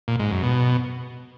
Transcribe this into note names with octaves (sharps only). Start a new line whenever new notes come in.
A#2
G#2
F#2
B2